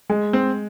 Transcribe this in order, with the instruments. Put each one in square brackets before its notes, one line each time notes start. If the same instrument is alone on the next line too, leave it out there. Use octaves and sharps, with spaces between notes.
[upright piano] G#3
[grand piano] C4